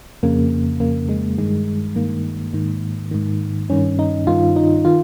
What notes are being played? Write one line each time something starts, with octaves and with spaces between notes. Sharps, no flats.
F2 C#3 A#3
F2 C#3 A#3
G#3
G2 D#3 G#3
G2 D#3 A#3
G#2 D#3
G#2 D#3
G2 D#3 C#4
D#4
G2 D#3 F4
D#4
D#3 F4